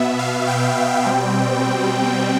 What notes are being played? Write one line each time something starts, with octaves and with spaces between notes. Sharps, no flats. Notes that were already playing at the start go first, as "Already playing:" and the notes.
Already playing: B2 B3 E5
F5
G5
B2 G3 C4